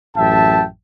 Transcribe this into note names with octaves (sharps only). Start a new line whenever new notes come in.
A1 F#2 E5 G5 A5